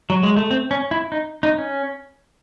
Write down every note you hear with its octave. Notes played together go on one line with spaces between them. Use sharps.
F#3
G#3
A3
C4
C#4
E4
D#4
D#4
C#4